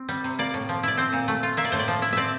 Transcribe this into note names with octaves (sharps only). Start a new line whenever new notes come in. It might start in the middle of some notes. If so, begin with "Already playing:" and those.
Already playing: C4
G3
C3
A#3 D5
A2
F3
E4 D5
C4 C5
A#2
A3
F4
A#3 E5
D5
A2 C5
D5
F3
E4
C4 D5 E5